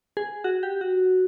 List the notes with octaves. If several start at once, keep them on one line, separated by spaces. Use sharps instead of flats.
G#4
F#4
G4
F#4